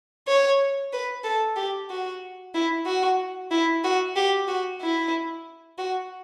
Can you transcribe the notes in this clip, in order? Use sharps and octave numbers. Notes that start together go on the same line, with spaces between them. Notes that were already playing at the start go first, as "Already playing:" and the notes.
C#5
B4
A4
G4
F#4
E4
F#4
E4
F#4
G4
F#4
E4
F#4